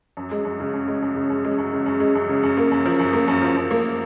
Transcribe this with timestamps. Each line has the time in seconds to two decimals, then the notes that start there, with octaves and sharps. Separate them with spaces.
0.17 F#2
0.31 G#3
0.45 F#2
0.60 C#3
0.73 F#2
0.88 G#3
1.02 F#2
1.16 C#3
1.30 F#2
1.45 G#3
1.58 F#2
1.73 C#3
1.86 F#2
2.00 G#3
2.15 F#2
2.29 C#3
2.43 F#2
2.57 A#3
2.71 F#2
2.85 F3
2.99 F#2
3.13 A#3
3.28 F#2
3.42 F3
3.57 F#2
3.71 A#3